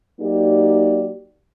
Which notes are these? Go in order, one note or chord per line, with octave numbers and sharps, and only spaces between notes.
F#3 A#3 D#4 G4 D5